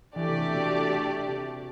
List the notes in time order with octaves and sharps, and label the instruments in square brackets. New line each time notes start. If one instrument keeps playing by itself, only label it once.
[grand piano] E3 [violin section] A3 D4 G4 D5
[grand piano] C3
B2
C3